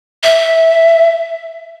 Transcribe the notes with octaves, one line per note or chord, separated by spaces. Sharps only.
E5